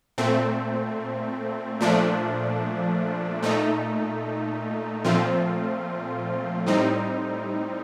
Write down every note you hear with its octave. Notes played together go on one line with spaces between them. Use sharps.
A#2 A3 C4
A#2 F3 A3 D4
A#2 A3 D#4
A#2 F3 A3 C4 F4
A2 G3 C4 D#4